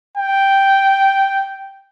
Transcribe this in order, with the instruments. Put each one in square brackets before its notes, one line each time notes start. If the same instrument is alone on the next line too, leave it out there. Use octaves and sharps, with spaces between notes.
[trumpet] G5